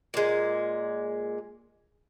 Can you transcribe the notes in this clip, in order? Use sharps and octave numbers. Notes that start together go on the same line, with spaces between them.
A#2 G#3